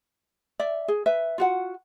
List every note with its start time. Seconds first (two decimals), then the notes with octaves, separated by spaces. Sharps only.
0.60 D5 E5
0.88 G#4
1.06 B4 E5
1.38 F4 F#4 F#5